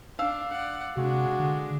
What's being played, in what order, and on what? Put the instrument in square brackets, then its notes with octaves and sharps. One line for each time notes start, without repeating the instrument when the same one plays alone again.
[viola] D4 [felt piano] F5 E6
[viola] D5 F#5
[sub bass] C3 [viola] G#3 D4 [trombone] F#4
[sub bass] D3